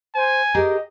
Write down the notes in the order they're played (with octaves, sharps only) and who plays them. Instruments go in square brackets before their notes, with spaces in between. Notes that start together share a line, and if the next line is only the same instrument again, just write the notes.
[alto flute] C5 [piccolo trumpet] G#5
[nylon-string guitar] G4 G#4 A#4 [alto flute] D#5